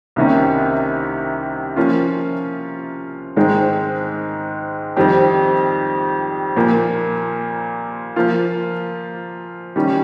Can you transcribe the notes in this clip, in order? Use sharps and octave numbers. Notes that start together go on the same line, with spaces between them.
C2 C3 D#3 A#3 C#4
F3 A#3 C#4 F4
G#2 D#3 G#3 C4
F2 D#3 G3 C4 G4
A#2 F3 A#3
F3 A#3 F4
D#3 G3 C#4